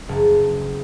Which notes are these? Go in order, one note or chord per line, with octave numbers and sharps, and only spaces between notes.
F#1